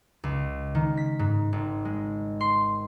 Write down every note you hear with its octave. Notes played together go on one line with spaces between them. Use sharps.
C#2
D#3
B6
G#2
G#1
G#3
C6